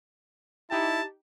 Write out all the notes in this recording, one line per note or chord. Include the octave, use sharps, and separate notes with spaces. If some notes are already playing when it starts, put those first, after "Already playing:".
D#4 E4 G4 A5